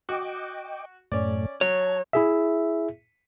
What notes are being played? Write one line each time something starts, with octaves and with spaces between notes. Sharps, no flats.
F#4 D#5 G5 D6
F#2 A2 A3 C#4 D5
F#3 C#5 A5
E4 G#4 E5